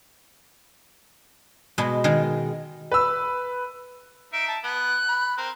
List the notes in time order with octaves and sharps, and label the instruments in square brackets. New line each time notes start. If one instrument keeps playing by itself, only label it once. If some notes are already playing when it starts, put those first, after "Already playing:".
[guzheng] B2 G#3
D#3 G#3
[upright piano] B4 E6
[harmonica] D#4 E5 [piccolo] D7
[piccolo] A5
[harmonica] B3 [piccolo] F#6
[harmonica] B5
C4 A#4